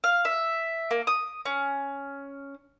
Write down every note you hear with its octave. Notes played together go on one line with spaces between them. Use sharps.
F5
E5
A#3
D#6
C#4